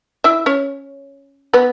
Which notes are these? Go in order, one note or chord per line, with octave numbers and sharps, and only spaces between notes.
E4 E5
C#4 C#5
B3 B4